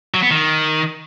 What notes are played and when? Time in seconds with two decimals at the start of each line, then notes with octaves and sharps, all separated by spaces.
0.14 F#3
0.23 B3
0.31 D#3